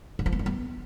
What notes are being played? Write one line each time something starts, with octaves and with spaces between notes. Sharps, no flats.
D3
F3
B3
G3
B3